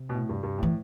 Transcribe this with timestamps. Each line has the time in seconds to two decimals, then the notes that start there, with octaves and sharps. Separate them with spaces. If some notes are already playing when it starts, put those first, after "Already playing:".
Already playing: C3
0.09 B2
0.14 A2
0.29 G2
0.43 G2
0.58 A2 E3